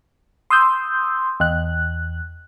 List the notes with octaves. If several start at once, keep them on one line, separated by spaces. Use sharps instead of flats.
C6 D#6 E6 G6
E2 F#6